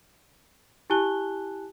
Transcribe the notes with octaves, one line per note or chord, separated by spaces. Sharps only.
E4 G4 G#5 A5 F#6 G7